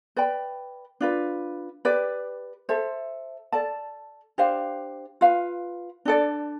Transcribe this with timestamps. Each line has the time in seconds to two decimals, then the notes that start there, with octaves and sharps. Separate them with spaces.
0.16 B4 D5 G5 B5
1.01 D4 F4 B4
1.85 G4 B4 D5
2.69 A4 C5 E5
3.52 A4 D5 A5
4.38 D4 G4 C5 F5
5.21 F4 B4 F5
6.05 D4 A4 D5